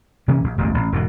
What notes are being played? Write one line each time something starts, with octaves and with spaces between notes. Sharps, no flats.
C3 E3 A#3 C#4
A#1
E1 A1 D2 G2
A1
E1 G#2 B2